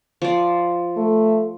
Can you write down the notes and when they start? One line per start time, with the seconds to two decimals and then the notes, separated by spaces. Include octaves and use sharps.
0.22 F3 D5
0.97 A3